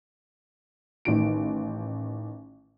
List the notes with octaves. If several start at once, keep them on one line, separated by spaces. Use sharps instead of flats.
A1 D#3 D7